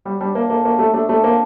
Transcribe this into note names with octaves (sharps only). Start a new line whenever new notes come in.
G3 F#4
G3 D4
A#3 D4
A#3 A4
A#3 F#4
A3 D4
A3 D4
A3 A4
A#3 C4